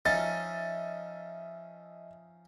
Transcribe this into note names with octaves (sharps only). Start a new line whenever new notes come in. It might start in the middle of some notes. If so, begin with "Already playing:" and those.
F3 C#4 D#4 D#5 E5 A6